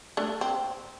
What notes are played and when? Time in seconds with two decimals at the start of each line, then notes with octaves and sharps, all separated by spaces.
0.17 A3 D4
0.41 C4